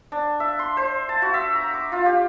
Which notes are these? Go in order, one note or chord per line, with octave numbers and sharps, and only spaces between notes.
D4
E5
C6
C5
A5
F#4
E5
A#5
D6
F4
G4